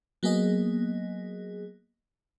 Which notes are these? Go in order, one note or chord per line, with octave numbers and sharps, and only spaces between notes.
F#3 A#3 B3 G#4 D#5